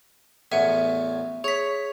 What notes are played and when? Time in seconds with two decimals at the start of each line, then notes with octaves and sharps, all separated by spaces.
0.52 A1 E2 E5 F#5 G#5
1.44 G#4 C#5 B6